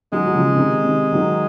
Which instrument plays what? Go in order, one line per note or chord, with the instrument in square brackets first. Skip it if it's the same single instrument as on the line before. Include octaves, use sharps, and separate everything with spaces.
[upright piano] D#3 F#3 [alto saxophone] G#3
[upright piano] F#3
C#3 F3
C3 D#3
C3 D#3
D#3 F#3